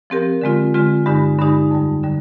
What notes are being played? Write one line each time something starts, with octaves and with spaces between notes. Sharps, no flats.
F3 C4 G4 A#4
D3 G#3 C4 F4
D3 G#3 C4 F4
G2 D3 G#3 D#4 G4
G2 D3 G#3 D#4 G4
F2 D3 G3
D3 G3